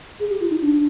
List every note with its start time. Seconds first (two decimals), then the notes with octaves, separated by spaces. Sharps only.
0.20 G#4
0.30 G4
0.40 F4
0.50 D#4
0.62 D4